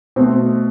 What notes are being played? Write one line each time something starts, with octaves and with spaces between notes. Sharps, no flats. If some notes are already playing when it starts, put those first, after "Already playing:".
B2 A3 C4